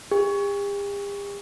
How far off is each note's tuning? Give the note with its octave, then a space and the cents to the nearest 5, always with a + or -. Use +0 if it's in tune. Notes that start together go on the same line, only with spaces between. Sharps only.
G4 +45